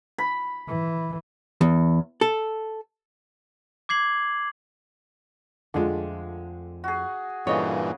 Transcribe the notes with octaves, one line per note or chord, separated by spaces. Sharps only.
B5
E3
E2
A4
D6 G#6 C7 F#7
F2 D3 G#3 A3 F4
F#4 G#4
G2 A#2 C#3 E3 A4 C#5 D#5